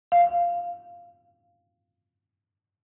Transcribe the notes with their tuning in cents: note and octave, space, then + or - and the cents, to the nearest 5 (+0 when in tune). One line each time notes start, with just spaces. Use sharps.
F5 -5